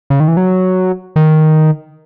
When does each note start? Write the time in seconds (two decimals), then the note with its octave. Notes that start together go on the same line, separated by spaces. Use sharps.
0.10 C#3
0.20 D#3
0.28 E3
0.37 F#3
1.16 D#3